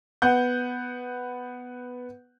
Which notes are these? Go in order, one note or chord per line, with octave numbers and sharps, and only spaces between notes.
B3 F#5 G6